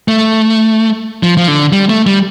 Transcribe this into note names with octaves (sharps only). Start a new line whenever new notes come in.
A3
F3
F3
D3
G3
A3
G3